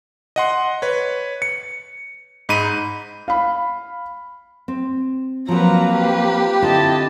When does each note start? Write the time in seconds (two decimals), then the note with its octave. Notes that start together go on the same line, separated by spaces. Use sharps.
0.36 D#5 F#5 C6
0.82 B4 C#5
1.42 C#7
2.49 G#2 D#4 B5 D#7
3.28 F5 B5
4.68 C4
5.49 F3 F#3 A#3 C4 B4 A#5
5.93 G4 B4
6.62 D3 C4 E4 F4 D#5 A5